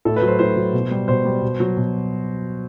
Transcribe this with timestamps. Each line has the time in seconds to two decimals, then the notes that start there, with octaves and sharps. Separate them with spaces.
0.05 A2 A4
0.16 B4
0.22 F#3
0.27 C5
0.39 A2 C5
0.57 F#3
0.73 B2
0.91 G3
1.08 B2 C5
1.25 G3
1.42 B2
1.60 F#3
1.77 B2